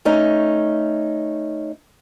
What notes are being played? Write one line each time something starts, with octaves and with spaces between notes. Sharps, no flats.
A3 C#4 D#4